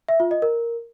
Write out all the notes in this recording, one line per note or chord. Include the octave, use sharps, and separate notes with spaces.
E5
F4
D#5
A#4